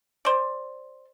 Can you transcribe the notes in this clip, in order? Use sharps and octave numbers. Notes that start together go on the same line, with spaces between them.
C5 D5